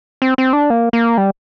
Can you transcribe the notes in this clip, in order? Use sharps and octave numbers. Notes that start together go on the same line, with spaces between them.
C4
C4
D4
A#3
A#3
G3